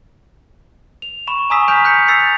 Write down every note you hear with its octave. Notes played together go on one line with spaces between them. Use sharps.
F7
B5 C#6 E7
G#5 A#5 C#6 D#6 E6 B6
G#5 F6 G6 B6 D7 F7
F#6 G6 B6 C#7 F7
E6 A6 C7 C#7 F7